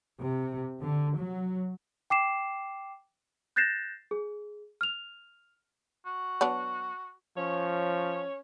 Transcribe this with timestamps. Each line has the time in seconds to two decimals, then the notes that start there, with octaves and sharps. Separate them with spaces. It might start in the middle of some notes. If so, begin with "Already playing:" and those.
0.21 C3
0.81 D3
1.18 F#3
2.10 G5 D6 C7 E7
3.56 F#6 G6 A6 A#6 C7 E7
4.11 G#4
4.81 F6 F7
6.06 F#4
6.41 F#3 B3 D4
7.37 F3 C#4 C#5